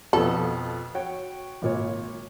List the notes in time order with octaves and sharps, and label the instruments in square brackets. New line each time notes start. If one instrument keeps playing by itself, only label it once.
[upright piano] F2 B2 F3 [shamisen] A4
[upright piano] F#4 C#5 G5
G#1 A#2 C#5